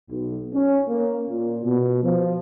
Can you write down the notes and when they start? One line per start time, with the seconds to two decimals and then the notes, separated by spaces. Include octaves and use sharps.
0.10 B1
0.52 C#4
0.87 A#3
1.29 A#2
1.64 B2
2.03 F3